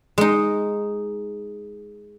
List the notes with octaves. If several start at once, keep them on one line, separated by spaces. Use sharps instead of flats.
G#3 D#4